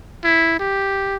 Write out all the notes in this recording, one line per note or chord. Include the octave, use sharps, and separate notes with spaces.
E4
G4